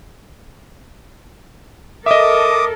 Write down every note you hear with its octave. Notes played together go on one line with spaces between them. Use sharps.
A4 A#4 D#5 E5 D6 D#6